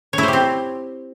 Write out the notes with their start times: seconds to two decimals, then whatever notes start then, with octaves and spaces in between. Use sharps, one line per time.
0.13 C#5
0.18 E4
0.23 C5
0.28 G4
0.33 C4